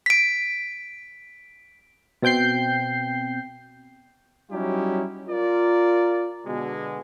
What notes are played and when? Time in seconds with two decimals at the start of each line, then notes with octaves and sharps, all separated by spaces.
0.06 B6 D7
2.22 B2 C4 G5 G6 C7
4.51 F#3 G3 C#4 D#4 E4 G4
5.30 F4 A#4 D5
6.46 B2 D3 G#3